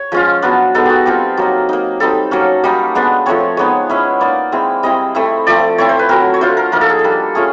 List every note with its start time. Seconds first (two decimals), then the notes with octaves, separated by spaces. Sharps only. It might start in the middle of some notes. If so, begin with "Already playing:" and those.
Already playing: C#5
0.12 F3 G#3 C#4 F4
0.42 F#3 B3 D4
0.75 G#3 B3 D#4 A4
0.85 F#4 G4
1.06 G3 C4 F4 G4
1.37 F#3 A#3 D#4
1.69 A#3 D#4
2.00 G3 C4 D#4 A4
2.31 F#3 A#3 C#4
2.63 G3 A#3 D#4
2.95 G#3 B3 D4
3.26 F3 A3 C4 C#5
3.57 G#3 B3 D#4 C#5
3.89 G#3 C#4 E4
4.21 A#3 D#4 D5
4.52 G#3 C4 E4
4.83 G3 C4 E4 D#5
5.15 A3 C4 E4
5.47 F3 A3 C4 D5
5.78 A3 C4 E4 C#5
5.89 C5
5.99 B4
6.09 F#3 A3 C4 A#4
6.34 C#5
6.41 A3 D4 F4 C5
6.57 A#4
6.72 F3 A#3 D#4 A#4
6.81 A4
6.90 G#4
6.99 A4
7.04 G3 A#3 D4
7.35 A3 C#4 F4 G#4